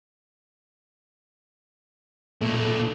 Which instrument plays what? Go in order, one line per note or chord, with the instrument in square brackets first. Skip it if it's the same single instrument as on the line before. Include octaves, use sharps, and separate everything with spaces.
[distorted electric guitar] B1 A#2 [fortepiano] A3